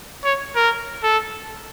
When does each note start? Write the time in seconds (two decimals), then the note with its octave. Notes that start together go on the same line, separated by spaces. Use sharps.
0.24 C#5
0.56 A#4
1.03 A4